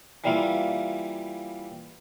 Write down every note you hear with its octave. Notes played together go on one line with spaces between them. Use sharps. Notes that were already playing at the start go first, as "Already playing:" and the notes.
E3 G3 A#3 E4 F4